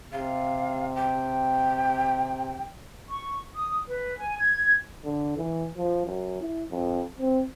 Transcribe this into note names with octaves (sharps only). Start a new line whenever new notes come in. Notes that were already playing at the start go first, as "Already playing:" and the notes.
C3 F5
G5
C#6
D#6
B4
G#5
G#6
D3
E3
F3
F#2
E4
F2
C4